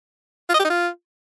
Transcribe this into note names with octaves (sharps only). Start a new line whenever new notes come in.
F4
D#5
G4
D#4
F4